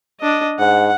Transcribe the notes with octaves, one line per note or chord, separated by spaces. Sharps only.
D4 D#5
G#2 F#5